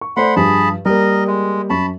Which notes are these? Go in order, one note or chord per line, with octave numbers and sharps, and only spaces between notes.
C#6
A3 C5 D5 F#5 B5 C6
G2 F3 G#4 A5 B5
G3 A#3 A#4 D#5
G#3
F#2 A5 B5 C#6